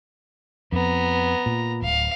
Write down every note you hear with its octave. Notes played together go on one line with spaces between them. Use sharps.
F2 B3 A#5
A#2
D1 F5